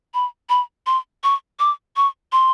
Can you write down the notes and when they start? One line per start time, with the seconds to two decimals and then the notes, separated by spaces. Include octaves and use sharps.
0.14 B5
0.50 B5
0.86 C6
1.24 C#6
1.59 D6
1.96 C#6
2.32 C6